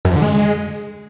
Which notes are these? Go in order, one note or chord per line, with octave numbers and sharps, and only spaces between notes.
F#2
F2
D3
G#3